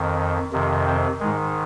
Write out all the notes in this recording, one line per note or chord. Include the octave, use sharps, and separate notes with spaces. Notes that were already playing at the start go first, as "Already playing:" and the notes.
Already playing: F2 D#3
F2 C3 D#3
C4
G#2 D#3 G#3